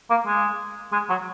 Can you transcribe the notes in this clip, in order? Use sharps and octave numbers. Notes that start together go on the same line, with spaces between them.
A#3
G#3
G#3
F#3